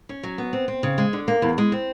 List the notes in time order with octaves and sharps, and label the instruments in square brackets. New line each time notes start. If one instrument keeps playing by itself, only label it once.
[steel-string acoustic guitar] C#4
F#3
B3
C4
C4
C#3
G#3
D3
A#3
E2
G#3
C4